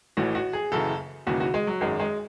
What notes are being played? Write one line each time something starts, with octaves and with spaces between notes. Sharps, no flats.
A1 A2 E3 F#4
F#4
G#4
F#1 F#2 C#3 E3 A4
E1 D#2 C#3 E3 F#4
F#4
G#3
F#3
G#1 F#2 D#3 G#3
G#3